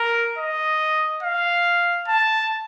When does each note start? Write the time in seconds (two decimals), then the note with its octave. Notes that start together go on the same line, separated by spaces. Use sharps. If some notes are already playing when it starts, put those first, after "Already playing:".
Already playing: A#4
0.38 D#5
1.23 F5
2.08 A5